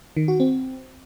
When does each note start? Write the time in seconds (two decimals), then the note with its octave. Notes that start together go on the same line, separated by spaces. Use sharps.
0.17 D#3
0.28 F#4
0.40 C4